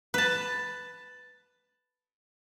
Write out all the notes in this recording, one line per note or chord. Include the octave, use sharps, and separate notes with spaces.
B4 A5